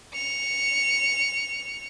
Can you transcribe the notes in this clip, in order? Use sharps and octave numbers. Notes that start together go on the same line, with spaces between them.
C#7 F7